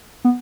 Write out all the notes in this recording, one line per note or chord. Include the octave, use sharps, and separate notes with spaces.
B3